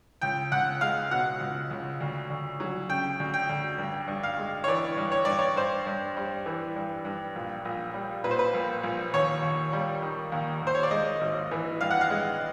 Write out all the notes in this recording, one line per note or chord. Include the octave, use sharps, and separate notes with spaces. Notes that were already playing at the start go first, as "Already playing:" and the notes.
C#2 G5
C#2 F#5
G#3 F5
B2 F#5
C#2
C#2
D2
D2
F#3
C#3 G5
D2
G5
D2
G2
G2
F5
G#3
C#5
E3 D5
G2
C#5
G2 D5
C#5
G2 C5
G2
G3
E3
G2
G2
A#1
A#1
G3
A#2 B4
C5
B4
A#1
A#1
D#2 C#5
D#2
G3
D#3
D#2
D#2 C5
C#5
D5
G#3 D#5
G#1
E3
G2 F5
F#5
F5
G#3